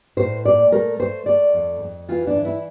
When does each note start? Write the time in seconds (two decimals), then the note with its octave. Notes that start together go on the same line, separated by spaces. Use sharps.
0.17 A2 C5
0.45 A#2 D5
0.72 A3 A#4
1.00 A3 C5
1.26 A3 D5
1.54 F2
1.81 F2
2.08 E3 F4
2.27 D4
2.36 E3
2.45 E4